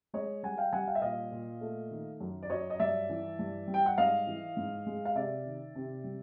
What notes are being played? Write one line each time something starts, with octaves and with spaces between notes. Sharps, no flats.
G#3 C#5 D#5
G3 F#5 G#5
F5 G5
G3 F#5 G#5
F5 G5
E5
A#2 D#5 F5
A#2
A3
D#3
F#2
D5
F#3 C#5 D#5
D#5
G2 D5 E5
E3
G2
G3
G5
F#5
G#2 D#5 F5
E3
G#2
G#3
F5
C3 D5 E5
D#3
C3
G3